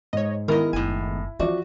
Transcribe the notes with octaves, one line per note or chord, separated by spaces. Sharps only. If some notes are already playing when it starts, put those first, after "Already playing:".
G#2 C#5 D#5
D#3 G#3 B3 E4 A#4 D#5
F#1 A2 G#5
F3 C#4 F#4 D5 E5